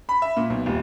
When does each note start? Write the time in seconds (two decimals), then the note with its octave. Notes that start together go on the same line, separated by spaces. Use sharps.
0.09 B5
0.22 E5
0.37 A#2
0.50 B1
0.66 D#1